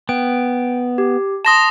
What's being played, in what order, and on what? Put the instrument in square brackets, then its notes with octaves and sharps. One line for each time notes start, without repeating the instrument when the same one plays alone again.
[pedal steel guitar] B3 [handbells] G5
[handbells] G4
[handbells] A5 C6 [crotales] D#6 A#6 E7